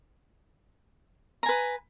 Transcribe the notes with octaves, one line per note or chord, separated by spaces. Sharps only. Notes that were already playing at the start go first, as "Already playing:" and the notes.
B4 G#5 A#5